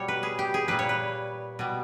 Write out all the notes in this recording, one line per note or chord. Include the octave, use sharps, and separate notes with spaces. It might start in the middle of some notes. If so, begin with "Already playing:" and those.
Already playing: B2 G3 C#5
B4
G#4
G4
G#4
A#2 G3 B4
C#5
B4
B2 G3